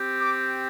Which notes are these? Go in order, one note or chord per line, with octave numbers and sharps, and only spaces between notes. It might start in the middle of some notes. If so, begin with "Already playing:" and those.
Already playing: C4 G4
D6